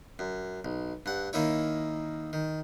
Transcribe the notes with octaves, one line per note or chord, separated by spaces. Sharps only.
F#2
B1
G2 F#5
D#3 A#3 D#4 E4 C#5
D#3